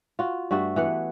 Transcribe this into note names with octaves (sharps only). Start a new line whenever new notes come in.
F4 F#4
G2 A3 F#4 E5
E3 B3 F#5